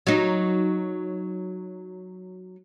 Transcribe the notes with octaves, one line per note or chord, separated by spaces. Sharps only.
F#3 D#4